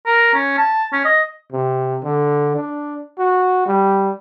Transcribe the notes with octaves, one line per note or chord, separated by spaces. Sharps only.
A#4
C#4
A5
C#4
D#5
C3
D3
D4
F#4
G3